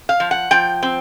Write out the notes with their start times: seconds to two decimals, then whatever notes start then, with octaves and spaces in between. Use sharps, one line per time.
0.09 F5
0.20 F3
0.31 F#5
0.51 F3 G5
0.83 C4